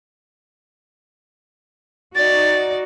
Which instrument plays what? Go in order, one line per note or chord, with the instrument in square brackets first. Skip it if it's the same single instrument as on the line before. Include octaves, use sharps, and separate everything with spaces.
[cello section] D#4 F#4 [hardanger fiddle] D5 [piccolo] A6